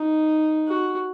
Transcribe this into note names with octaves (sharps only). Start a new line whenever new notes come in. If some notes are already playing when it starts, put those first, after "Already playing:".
Already playing: D#4
F#4